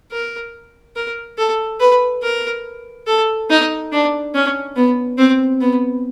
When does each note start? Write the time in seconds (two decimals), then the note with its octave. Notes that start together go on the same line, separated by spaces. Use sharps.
0.12 A#4
0.96 A#4
1.38 A4
1.80 B4
2.23 A#4
3.07 A4
3.50 D#4
3.92 D4
4.35 C#4
4.76 B3
5.18 C4
5.61 B3